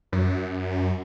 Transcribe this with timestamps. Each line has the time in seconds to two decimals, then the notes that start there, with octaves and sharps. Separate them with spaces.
0.12 F#2